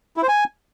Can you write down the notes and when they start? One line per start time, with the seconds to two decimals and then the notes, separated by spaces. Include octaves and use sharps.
0.17 E4
0.23 C5
0.28 G#5